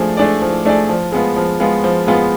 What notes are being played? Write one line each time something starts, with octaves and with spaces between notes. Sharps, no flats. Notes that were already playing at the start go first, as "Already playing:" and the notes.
Already playing: F3 A3 D4 G#4
A3 D4 G#4 D5
F3
A3 D4 G#4 D5
F3
G#3 B3 F4
F3
G#3 B3 F4
F3
G#3 B3 F4